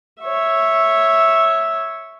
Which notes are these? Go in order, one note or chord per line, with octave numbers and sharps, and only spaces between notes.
C#5 E5